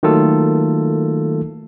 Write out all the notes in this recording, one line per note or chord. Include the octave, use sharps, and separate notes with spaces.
D#3 F#3 A3 A#3 F4 A4